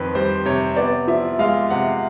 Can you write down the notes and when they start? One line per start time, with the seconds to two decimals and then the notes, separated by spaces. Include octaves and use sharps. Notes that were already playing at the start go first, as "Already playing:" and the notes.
Already playing: F2 D#3 B4
0.15 G3 C5
0.46 C3 C#5
0.76 B3 D5
1.08 F3 E5
1.39 G#3 F5
1.70 C3 F#5